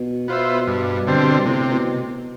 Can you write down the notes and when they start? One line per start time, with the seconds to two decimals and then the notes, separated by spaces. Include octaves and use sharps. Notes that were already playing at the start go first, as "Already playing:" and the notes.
Already playing: B2
0.28 B3 F4 C5 E5
0.67 G2
1.07 D3 G3 C4
1.46 A2 C3
1.72 B2